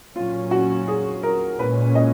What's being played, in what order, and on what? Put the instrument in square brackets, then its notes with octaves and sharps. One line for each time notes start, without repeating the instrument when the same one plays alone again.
[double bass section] A#2 F#3 C#4 [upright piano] F4
[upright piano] F#4
G#4
A#4
[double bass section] A#2 G#3 C#4 [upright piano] B4
[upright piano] D#5